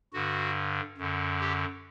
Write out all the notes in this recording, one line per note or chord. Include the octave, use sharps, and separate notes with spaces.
G2 D3 F#4
F#2 D3
G4